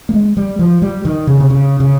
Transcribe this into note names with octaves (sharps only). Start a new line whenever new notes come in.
A#3
G#3
G3
F3
G3
D#3
C#3
C3
C#3
C#3